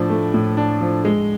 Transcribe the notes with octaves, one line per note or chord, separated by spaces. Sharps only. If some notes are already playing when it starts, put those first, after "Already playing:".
Already playing: A2 F3 D4
A3
A2
D4
F3
G#3